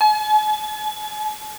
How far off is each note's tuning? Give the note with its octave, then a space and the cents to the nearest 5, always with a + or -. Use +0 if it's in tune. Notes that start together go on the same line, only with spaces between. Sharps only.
G#5 +45